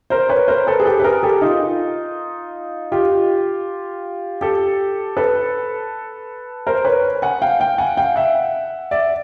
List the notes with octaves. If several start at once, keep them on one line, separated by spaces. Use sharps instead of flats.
A#4 C5
B4 C#5
A#4 C5
A4 B4
G#4
G4 A4
B4
G#4 A#4
G4 A4
D#4 F4
F4 G4
G4 A4
A4 B4
A#4 C5
B4 C#5
F#5 G#5
F5 G5
F5 G5
F#5 G#5
F5 G5
E5 F#5
D5 E5